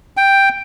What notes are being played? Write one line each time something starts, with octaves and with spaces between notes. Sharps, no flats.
G5